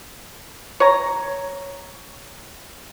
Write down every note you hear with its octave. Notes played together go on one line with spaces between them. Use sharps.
C#5 A#5